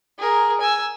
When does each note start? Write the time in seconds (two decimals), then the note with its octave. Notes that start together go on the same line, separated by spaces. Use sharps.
0.18 G#4 A#4
0.61 G#5 E6